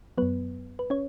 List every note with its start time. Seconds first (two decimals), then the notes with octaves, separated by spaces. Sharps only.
0.18 F#2 F#3 B3 B4
0.79 B4
0.90 C#4 C#5